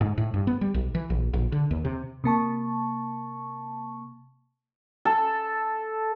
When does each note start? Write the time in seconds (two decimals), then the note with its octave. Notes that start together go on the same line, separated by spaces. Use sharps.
0.01 G#2
0.18 A2
0.34 G2
0.47 B3
0.61 G3
0.74 B1
0.95 E3
1.10 A#1
1.33 A#1
1.52 D3
1.71 D#2
1.85 C3
2.24 C3 A#3 A5 C#6
5.05 A4